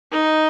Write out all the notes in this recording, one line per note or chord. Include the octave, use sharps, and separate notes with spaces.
D#4